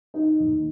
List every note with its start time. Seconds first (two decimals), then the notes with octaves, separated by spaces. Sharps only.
0.14 D#4
0.40 D#2